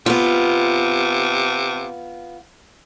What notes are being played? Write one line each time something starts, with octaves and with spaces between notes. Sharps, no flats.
C3 B3 F4